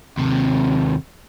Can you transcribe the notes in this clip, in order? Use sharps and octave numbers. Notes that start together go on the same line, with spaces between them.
D#2 C3